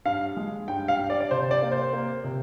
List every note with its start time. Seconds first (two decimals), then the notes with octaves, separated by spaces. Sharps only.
0.05 G2 F5
0.37 G#3
0.68 G2 G5
0.88 F5
0.99 G2
1.10 D5
1.21 D5
1.31 C3 C5
1.51 D5
1.62 A#3
1.72 C5
1.93 A#3
2.24 C3